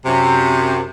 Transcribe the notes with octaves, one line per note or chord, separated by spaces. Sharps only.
F#2 C3